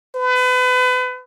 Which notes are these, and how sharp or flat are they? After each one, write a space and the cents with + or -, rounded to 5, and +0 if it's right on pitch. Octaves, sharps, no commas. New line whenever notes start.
B4 +35